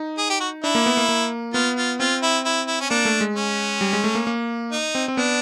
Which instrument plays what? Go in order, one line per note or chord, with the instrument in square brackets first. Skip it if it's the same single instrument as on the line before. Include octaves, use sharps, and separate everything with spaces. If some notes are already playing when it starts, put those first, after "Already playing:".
Already playing: [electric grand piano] D#4
[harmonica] G#4
G4
F#4
[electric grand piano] D4 [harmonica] E4
[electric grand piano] A#3
B3
A#3
A#3
[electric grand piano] B3 [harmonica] F4
[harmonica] F4
[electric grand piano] C4 [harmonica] F4
[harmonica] E4
E4
E4
C#4
[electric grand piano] A#3 [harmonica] D4
[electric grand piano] A3
G#3
[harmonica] C#4
[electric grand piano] G3
G#3
A3
A#3
A#3
[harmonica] D#4
[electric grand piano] C4
C4
[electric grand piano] B3 [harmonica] D4